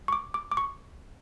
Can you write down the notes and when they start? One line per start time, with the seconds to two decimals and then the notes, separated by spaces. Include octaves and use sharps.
0.08 C#6
0.13 D6
0.34 D6
0.51 D6
0.57 C#6